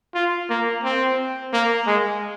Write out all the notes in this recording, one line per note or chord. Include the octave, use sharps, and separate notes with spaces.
F4
A#3
C4
A#3
G#3